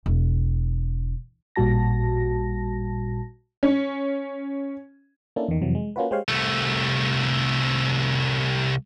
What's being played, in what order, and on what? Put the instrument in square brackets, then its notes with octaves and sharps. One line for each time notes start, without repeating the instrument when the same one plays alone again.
[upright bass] E1
[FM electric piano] A1 A#2 G3 F#4 A5 A#6
[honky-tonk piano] C#4
[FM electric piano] A#3 C#4 D4 E4 A4
E2 D#3
F2 C3 E3 F#3
G#3
A#3 C#4 F4 F#4 B4
G#3 G4 C5 C#5 F5
[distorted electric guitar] C2 A3